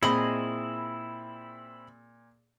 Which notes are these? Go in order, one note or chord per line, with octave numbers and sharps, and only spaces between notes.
A#2 C4 E4 G#4 D#5 B5 F#7